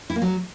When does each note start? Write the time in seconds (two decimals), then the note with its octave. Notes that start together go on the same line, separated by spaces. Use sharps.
0.10 E4
0.16 A#3
0.22 F#3